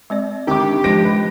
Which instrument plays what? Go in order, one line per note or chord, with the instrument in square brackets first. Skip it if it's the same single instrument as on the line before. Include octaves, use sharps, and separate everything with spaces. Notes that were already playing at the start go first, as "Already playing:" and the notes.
[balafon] G#3 C4 D5
[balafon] D3 G#3 C4 [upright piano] D#3 D6 [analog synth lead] G4
[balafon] D4 D#4
[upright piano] F3 A#6 D7 [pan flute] G#3
[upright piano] B4